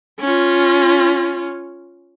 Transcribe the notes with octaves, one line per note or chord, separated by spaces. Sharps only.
C#4 F4